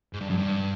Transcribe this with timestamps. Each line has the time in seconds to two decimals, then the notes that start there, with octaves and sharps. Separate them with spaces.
0.13 G#2
0.21 G2
0.30 F#2
0.38 G2